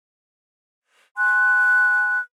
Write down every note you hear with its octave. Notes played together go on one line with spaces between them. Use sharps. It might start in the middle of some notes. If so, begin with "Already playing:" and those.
G#5 C6 F#6